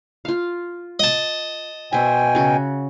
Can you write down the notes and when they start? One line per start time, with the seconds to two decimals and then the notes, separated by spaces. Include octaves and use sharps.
0.25 F4 F5
1.00 D#5 A5
1.93 B2 C5 E5 G5 G#5
2.35 C#3 F#4